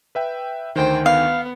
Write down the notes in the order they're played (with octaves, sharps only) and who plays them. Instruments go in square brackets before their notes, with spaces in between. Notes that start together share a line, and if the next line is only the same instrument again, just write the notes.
[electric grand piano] B4 E5 G5
[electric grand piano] D2 D#3 [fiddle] C5 G5
[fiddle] B3 [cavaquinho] F5